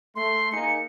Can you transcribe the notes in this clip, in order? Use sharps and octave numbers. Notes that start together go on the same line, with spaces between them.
A3 C6
A#3 D#4 G#4 C#7